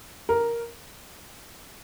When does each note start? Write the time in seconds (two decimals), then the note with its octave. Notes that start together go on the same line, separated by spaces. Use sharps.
0.29 A#4